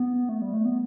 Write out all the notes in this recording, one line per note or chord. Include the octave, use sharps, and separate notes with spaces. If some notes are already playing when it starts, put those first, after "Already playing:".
Already playing: B3
A3
G3
A3
B3